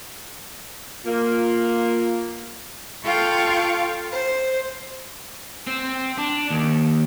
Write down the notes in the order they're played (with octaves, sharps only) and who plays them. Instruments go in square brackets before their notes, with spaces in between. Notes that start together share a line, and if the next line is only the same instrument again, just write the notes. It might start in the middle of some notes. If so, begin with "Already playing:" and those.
[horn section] A#3 [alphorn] F4
[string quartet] F4 A4 F5 G5 C#6
C5
[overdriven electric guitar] C4
D4
D#2